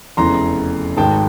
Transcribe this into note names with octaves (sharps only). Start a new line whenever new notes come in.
F1 E2 C#3 E3 A#5 C6
G#1 G#2 D#3 G5 A5